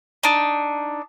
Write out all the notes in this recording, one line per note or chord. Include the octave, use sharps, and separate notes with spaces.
D4 D#4